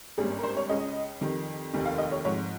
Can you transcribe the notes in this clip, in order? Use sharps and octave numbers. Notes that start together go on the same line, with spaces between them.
G#1 G2 G3 A#3 C#4 G#4
A#4
C5
C#5
C#2 C#3 G#3 C#4 D#5
F2 D#3 G3
F1 D#2 D#3 G3
F5
D#5
C#5
G#2 F3 C4 C#5